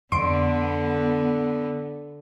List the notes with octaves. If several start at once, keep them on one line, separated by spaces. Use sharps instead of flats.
F2 D3 B3 C6 D7